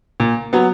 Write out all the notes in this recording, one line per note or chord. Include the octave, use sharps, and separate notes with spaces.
A#2
F#3 B3